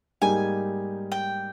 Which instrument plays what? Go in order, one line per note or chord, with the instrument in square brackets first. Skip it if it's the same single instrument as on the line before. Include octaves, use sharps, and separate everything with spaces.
[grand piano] G#2 G3 A#3 D#4 G4 [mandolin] G#5
[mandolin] G5